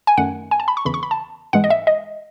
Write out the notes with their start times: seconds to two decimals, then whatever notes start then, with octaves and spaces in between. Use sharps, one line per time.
0.07 G#5
0.17 F#2 D#3 A3 F#5
0.51 G#5
0.60 A5
0.68 B5
0.77 C#6
0.85 E2 C#3 E3 B5
0.94 C#6
1.03 B5
1.11 A5
1.53 G#2 E3 G#3 F#5
1.64 D#5
1.70 E5
1.87 D#5